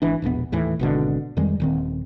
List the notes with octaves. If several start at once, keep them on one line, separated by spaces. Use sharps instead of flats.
G#1 E3 D4
E1 A#1 G#2 B3
D#2 A2 E3
G#1 B2 D3
F2 D#3 G3 G#3
D#1 D#3 C4